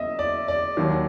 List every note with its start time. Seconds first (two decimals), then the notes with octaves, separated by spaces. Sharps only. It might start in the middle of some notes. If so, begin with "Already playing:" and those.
Already playing: E2 C#3 F#3 A#3 D#5 E5
0.19 D5
0.48 D5
0.77 D#2 D#3 F#3